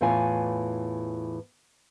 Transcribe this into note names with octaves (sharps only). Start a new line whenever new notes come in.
E2 A2 E3 F4 C#5 G#5